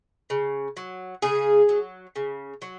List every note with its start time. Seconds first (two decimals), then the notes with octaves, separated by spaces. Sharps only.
0.30 C#3
0.77 F#3
1.22 C#3 G#4
1.69 F#3
2.16 C#3
2.62 F#3